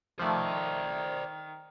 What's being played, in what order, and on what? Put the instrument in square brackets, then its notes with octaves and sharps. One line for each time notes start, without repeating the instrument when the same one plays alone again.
[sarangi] D#3 [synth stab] F3 A3 [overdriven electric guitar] C5 D5